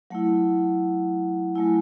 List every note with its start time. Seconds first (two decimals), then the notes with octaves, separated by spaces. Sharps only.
0.10 F#3 A3 E4 F#5
1.56 F#3 A3 E4 G#5